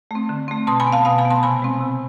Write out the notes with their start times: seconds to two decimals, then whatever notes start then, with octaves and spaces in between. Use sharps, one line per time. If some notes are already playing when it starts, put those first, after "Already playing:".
0.11 A3 C4
0.29 D3
0.48 A3 C4
0.67 B2 A5 C6
0.80 G#5 B5
0.87 B3
0.92 F5 A5
1.05 B2 F5 A5
1.18 G#5 B5
1.25 B3
1.30 A5 C6
1.43 C3 G#5 B5
1.62 G#3 C4
1.81 C3